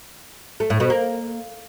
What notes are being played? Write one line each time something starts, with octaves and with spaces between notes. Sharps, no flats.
A3
A2
B2
A#3